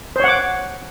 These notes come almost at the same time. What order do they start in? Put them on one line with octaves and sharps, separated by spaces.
C5 C#5 F#5 D6